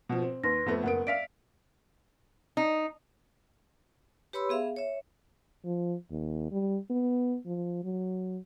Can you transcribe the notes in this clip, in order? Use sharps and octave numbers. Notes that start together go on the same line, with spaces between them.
B2 F3
C4
D#2 B4 C6 A#6
F2 A3 B3
F#1 B3 A#4 F#5 D7
D5 E5 F5 B6 D7
D#4
G4 B4 C#5 B5 C6 E6
B3 G#4 E5 F5
C#5 E5
F3
D#2
G3
B3
F3
F#3